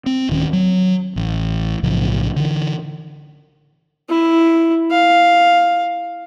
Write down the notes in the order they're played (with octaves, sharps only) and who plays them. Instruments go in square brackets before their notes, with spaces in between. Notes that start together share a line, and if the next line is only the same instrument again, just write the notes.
[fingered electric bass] C4
D1 D#3 C#4
F#3
A1
B1 A2 C#3 F3
D3 E3
[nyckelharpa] E4
F5